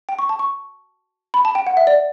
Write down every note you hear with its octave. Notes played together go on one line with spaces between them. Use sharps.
G5
C#6
A5
C#6
B5
A5
G5
F#5
E5
D5